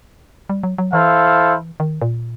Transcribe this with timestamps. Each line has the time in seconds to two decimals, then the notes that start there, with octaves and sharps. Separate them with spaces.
0.50 G3
0.63 F#3
0.78 F#3
0.93 E3 E4 A4 C5 F5
1.80 D#3
2.02 A#2